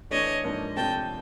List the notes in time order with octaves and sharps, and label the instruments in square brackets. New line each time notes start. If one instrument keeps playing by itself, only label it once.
[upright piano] E3 A3 D4 [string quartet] C#5 D#5
[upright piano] G#2 F3 A#3 D4
[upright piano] C3 F3 A3 D4 G4 [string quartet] G5 A5